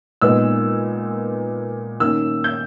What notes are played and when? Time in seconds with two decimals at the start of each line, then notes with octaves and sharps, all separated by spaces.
0.22 A#2 G#3 B3 D#4 E6
2.00 D#3 A#3 C#4 E6
2.44 G6